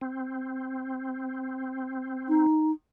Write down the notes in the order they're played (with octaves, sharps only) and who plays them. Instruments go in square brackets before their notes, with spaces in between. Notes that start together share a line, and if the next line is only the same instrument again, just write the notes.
[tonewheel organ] C4
[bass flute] D#4